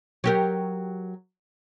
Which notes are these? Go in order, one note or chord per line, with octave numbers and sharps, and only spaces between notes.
F#3 G4 A#4